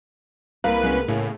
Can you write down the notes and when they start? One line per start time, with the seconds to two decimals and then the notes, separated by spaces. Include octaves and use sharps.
0.64 C2 A#3 A#4 B4 F5
0.83 G#3 B3 C#4
1.08 A2 C#3